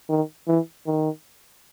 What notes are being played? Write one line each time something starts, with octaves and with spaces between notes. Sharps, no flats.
D#3
E3
D#3